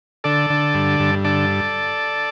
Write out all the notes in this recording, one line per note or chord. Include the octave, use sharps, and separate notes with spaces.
D3 A4 D5
D3
G2
G2
D3 A4 D5